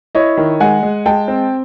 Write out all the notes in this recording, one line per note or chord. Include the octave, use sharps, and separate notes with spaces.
E4 C#5 D#5
D#3
G#3 F#5 G#5
G#3
G#3 G5 A5
C4